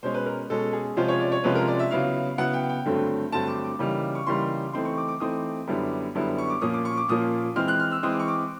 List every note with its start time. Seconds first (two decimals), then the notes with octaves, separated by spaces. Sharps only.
0.03 B2 G#3 C#4 C5
0.14 B4
0.26 A#4
0.50 B2 G#3 C#4 A4
0.73 G#4
0.96 C3 F3 G#3 C#4 F4 C5
1.08 C#5
1.20 D5
1.32 C#5
1.44 C3 F3 G#3 C#4 F4 B4
1.55 A#4
1.68 D5
1.79 E5
1.91 C#3 F#3 B3 E4 F5
2.38 C#3 F#3 B3 E4 F#5
2.53 G5
2.69 G5
2.85 G2 D3 F#3 A3 C4
3.32 G2 D3 F#3 A3 C4 A5
3.48 D6
3.64 D6
3.79 C#3 E3 G3 A#3 D#4
4.15 C#6
4.27 C#3 E3 G3 A#3 D#4 C6
4.73 E3 A3 C4 D#4 C6
4.85 C#6
4.97 D6
5.08 D6
5.20 E3 A3 C4 D#4 D#6
5.67 F#2 D3 G3 B3 E4
6.15 F#2 D3 G3 B3 E4
6.38 C#6
6.50 D6
6.62 A#2 F3 A#3 C#4 D#6
6.74 D6
6.85 C#6
6.97 D6
7.09 A#2 F3 A#3 C#4 D#6
7.56 E3 G#3 C4 F6
7.68 F#6
7.80 F6
7.92 E6
8.03 E3 G#3 C4 D#6
8.12 D6
8.20 C#6
8.28 D6